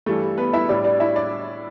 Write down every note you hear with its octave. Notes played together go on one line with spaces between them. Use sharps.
G2 E3 G3 A3 A4
B3 B4
E4 E5
A2 G3 D4 D5
D4 D5
E4 E5
D4 D5